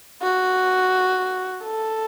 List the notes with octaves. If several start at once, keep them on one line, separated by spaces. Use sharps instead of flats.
F#4
A4